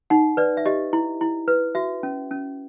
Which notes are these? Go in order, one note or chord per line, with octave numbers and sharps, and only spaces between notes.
D#4 F#5
B4 D5
E5
G4 D#5
E4
E4
B4
F#4 E5
C#4
C#4